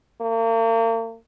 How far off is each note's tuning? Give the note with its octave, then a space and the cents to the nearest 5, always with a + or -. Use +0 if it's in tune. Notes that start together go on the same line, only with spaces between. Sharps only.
A#3 -40